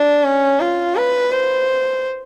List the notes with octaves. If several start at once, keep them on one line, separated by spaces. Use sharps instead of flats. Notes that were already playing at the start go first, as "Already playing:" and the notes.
Already playing: D4
C#4
F4
B4
C5